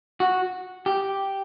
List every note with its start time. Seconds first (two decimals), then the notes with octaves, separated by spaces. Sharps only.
0.20 F#4
0.86 G4